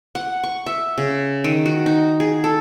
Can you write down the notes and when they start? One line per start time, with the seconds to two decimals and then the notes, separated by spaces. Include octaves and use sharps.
0.15 F#5
0.43 C#6
0.66 E5
0.98 C#3
1.44 D#3
1.66 F#4
1.86 D#4
2.20 G#4
2.44 A4